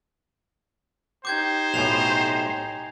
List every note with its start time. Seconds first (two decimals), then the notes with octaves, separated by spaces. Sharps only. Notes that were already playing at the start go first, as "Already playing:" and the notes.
1.25 D#4 G4 C5 D6 G6 G#6
1.74 B1 A2 G#5 C7 F7